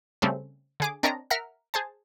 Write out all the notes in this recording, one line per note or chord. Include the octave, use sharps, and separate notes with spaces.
C#3 G3 A3 C4 C#4
D3 G#4 D6
C4 D4 A#4 C#5 D#5 A#5
A#4 E5 F#5 F6
G#4 C5 A5